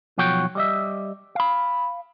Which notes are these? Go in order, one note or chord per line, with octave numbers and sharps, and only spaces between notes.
B1 F3 F#4 C#5 G5
G3 D#5 E5
F5 B5